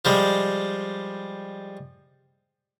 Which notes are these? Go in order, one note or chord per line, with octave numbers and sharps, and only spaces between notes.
F3 G3 G#3